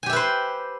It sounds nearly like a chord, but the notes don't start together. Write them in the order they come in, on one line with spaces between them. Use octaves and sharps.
G#5 G4 E5 B4 C5